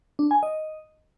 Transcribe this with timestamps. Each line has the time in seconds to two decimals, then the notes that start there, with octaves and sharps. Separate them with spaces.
0.19 D4
0.31 G#5
0.43 D#5